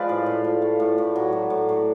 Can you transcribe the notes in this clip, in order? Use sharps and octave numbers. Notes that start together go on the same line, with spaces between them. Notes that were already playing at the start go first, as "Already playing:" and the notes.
Already playing: F3 G#3 B4 D5 F5
A2
A2
F3
A3
A2
A2
F#3
A3
A2
A2